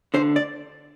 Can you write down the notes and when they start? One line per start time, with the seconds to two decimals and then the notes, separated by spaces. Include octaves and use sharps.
0.14 D2 D3 C5
0.36 D5